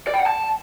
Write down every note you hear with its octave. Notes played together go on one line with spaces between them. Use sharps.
D5
G5
F#5
A5